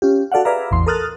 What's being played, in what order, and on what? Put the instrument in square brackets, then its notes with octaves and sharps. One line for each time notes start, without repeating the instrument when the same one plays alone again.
[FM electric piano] C#4 F4 G4
F#4 A4 D5 F5 F#5
G#4 B4 D5 E5 F5 A#5
A1 E2 C6
A4 A#4 D#6 F6 F#6 A6